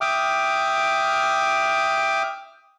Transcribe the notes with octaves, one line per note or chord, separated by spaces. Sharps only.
E5 G5 D6 D#6 F6